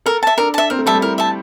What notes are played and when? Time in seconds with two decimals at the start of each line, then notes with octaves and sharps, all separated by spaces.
0.06 A4 A#4
0.23 E5 A5
0.38 D4 A#4
0.54 E5 A5
0.70 C4 A#4
0.78 A3
0.86 G3 E5 A5
0.94 A3
1.02 E4 A#4
1.18 E5 A5